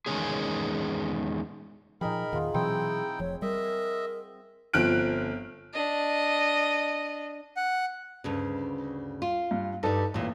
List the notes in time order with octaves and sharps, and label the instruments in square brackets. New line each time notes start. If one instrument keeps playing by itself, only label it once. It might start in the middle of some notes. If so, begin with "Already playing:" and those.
[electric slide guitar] E2 D#3 F3 G#3 C#4 G#4
[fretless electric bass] A#2 F3 [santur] D#4 G#4 G5 [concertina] A#4 B5
[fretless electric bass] E2 A#2 D#3 [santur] F4 F#5 [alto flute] G#4
[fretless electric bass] B2 E3 F#3 [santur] C4 E6 [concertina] D#4 E4 G5
[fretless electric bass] F1 F3 [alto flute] C#5
[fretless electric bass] G3 [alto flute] A#4 [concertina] D#5 E5
[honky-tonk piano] G1 F3 C4 F6 F#6 D7
[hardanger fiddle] D4 D#5
[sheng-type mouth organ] F#5
[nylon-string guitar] D2 G2 C#3
F4
[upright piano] G2
[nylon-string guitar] G2 G3 [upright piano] D#4 A4 D#5
[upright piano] A1 [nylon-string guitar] E2 A#2